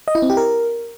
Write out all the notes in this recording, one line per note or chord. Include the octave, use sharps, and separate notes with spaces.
D#5
E4
C4
G4
A#4